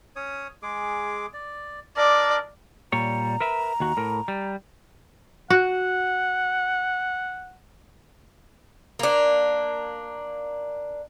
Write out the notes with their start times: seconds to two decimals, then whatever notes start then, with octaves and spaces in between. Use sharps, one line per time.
0.16 C#4 C#5 D#6
0.63 G#3 G#4 D6
1.33 D5
1.97 D4 A#4 D5 D#5
2.92 A#2 G3 C#5 A#5
3.40 A#4 B4 E5
3.80 D#2 F#4
3.97 A2 A#4
4.28 G3
5.50 F#4 F#5
8.99 A#3 D4